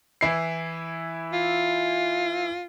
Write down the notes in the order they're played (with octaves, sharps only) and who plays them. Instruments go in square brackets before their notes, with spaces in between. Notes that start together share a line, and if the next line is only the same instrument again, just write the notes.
[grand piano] E3 E4 C7
[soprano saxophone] F4